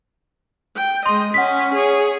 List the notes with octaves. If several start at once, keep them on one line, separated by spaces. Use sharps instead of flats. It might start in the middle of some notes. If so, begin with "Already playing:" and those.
G5
G#3 D#5 C6
C#4 F#5 B6
G#4 C#5